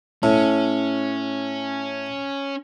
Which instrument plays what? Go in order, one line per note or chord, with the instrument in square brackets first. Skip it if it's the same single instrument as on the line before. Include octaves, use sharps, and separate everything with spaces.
[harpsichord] A2 [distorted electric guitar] C#4